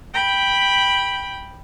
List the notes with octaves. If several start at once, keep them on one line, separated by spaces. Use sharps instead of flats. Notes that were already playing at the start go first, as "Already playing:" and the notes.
G5 B5